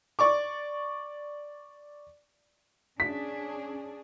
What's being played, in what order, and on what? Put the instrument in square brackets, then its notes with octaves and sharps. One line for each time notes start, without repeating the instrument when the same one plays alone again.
[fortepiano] D5 C#6 D6
[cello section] C#4 D4 G#4 [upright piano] B6